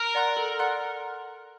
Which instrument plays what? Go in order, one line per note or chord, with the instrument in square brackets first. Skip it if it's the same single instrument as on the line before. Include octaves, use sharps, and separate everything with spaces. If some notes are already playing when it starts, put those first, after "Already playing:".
Already playing: [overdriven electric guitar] A#4
[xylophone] D5 F#5 C6 F#6
A4
D5 F#5 C6 F#6